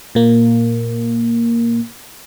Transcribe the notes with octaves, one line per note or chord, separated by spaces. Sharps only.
A#2 A#3